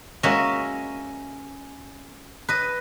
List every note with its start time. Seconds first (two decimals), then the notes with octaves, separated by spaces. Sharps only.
0.23 G#3 A#3 C#4 F#4 D#5 E5
2.49 B4 D#5